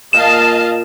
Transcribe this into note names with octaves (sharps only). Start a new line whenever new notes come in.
A#2 D#5 F5 A5 E7